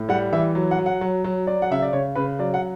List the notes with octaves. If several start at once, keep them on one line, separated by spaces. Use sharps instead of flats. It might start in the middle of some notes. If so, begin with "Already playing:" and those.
Already playing: A2
G3 F#5
E3 E5
F#3
F#5
F#3
F#5
F#3
F#3
F#3 D5
F#5
C#3 E5
D5
C#3 C#5
C#3 B4
F#3 D5
F#5